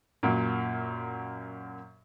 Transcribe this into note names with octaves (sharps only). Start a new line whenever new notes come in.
F#2 A#2